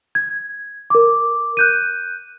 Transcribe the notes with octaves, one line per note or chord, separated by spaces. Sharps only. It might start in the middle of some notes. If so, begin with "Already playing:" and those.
G#6
A#4 D6
F#6 G6 D#7